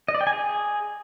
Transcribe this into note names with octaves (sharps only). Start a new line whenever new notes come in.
D#5
D5
G5
G#5
G#4